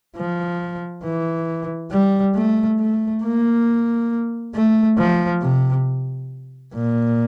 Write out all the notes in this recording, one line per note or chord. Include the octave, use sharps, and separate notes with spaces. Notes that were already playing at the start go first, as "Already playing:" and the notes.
F3
E3
G3
A3
A3
A#3
A3
F3
C3
A#2